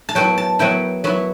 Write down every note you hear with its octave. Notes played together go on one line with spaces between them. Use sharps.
A5
F#3 B3 E4 G5
A5
F#3 B3 E4 G5
F#3 B3 E4